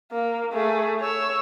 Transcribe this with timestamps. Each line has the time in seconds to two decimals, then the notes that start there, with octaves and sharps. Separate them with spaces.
0.12 A#3
0.53 A3 G#4
1.01 C#5 E6